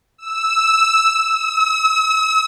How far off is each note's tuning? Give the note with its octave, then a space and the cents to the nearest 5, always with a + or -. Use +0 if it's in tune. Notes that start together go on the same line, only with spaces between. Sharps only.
E6 -5
E6 -40